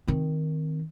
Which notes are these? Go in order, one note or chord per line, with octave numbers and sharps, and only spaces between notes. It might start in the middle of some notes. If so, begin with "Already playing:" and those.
D#3 C4